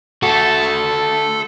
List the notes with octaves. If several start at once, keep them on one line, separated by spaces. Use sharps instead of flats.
A3 F#4 A4